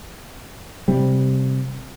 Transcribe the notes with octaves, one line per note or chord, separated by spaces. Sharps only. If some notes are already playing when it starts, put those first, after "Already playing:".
C3 G3